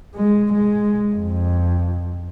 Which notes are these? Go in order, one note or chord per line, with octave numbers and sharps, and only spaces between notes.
G#3
G#3
F2